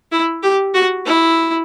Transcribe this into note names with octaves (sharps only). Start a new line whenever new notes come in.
E4
G4
F#4
E4